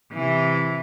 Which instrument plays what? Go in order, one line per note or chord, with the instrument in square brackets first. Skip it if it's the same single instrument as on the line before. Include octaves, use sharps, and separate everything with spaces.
[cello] C3 E3